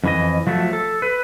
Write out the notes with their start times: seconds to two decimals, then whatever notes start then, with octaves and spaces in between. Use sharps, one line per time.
0.04 F2 E3 D#5
0.47 F3 F#3 A3
0.73 A4
1.02 B4